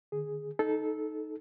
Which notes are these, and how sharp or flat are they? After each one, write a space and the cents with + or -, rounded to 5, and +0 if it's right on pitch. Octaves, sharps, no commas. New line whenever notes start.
D3 +40 G#4 +0
D#4 +0 A4 -20